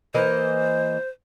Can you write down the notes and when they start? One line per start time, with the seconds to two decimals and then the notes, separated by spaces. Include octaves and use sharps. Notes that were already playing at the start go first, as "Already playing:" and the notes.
0.14 E3 A#3 C5 D#5